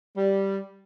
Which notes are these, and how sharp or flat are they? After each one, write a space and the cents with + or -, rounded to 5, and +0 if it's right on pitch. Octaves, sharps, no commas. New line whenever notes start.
G3 -5